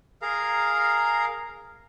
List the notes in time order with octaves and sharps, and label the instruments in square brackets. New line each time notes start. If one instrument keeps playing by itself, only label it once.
[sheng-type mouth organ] G#4 A#4 F5 A#5